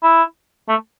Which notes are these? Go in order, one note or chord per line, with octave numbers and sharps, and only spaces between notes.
E4
A3